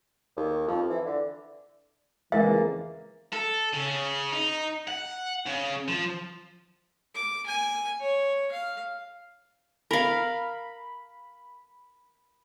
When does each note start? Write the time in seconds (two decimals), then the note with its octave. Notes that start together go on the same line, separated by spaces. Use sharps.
0.36 D#2
0.67 F2
0.89 E3
1.05 D3
2.32 F2 C#3 E3 G#3 A#3 E5 A6
3.33 A4
3.74 C#3
4.33 D#4
4.88 F#5
5.46 C#3
5.88 F3
7.15 D6
7.47 G#5
8.00 C#5
8.52 F5
9.91 A#4 F5 B5